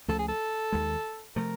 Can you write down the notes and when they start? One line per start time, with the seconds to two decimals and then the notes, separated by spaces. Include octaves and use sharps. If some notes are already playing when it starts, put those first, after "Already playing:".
0.08 C#2 C#3 F3 A3 A4
0.19 G#4
0.28 A4
0.72 D#2 D#3 G#3
1.36 C3 F3 A3 A#4